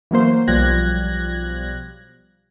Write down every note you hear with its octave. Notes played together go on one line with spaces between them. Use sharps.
E3 F#3 A#3 C5
B1 F3 G3 F#6 G#6 A#6